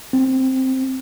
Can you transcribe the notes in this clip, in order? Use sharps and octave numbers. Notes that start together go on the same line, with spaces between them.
C4